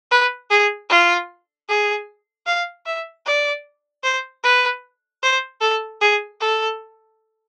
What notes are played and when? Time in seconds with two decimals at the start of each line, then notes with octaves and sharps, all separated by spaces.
0.11 B4
0.50 G#4
0.90 F4
1.69 G#4
2.46 F5
2.86 E5
3.26 D5
4.03 C5
4.43 B4
5.22 C5
5.61 A4
6.01 G#4
6.40 A4